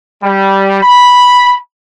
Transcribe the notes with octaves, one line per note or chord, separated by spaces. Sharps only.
G3
B5